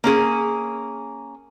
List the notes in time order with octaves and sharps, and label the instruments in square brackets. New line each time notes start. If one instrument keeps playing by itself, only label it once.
[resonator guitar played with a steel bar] A#3 C#4 G#4